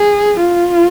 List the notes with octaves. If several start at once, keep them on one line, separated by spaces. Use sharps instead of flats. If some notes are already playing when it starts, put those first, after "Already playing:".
Already playing: G#4
F4